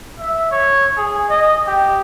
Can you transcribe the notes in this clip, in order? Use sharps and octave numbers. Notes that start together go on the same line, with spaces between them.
E5
C#5
G#4
D#5
G4